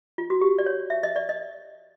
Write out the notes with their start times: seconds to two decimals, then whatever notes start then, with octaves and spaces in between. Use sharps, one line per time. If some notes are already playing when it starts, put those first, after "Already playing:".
0.18 F4
0.30 F#4
0.41 G4
0.58 D5
0.66 C#5
0.90 E5
1.03 D#5
1.16 D5
1.29 D#5